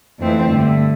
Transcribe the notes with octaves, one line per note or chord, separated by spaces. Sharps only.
F2 E3 A3 C4
G2 D3 A3